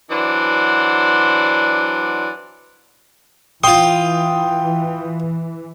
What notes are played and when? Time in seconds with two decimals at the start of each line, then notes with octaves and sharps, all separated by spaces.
0.11 E3 F#3 D4 C5 D5 F#5
3.64 E3 F4 G5 C6 D#6